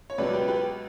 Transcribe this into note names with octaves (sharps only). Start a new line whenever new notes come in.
C#5
C#2 B2 F#3 B4 D5
G4 B4
G4 B4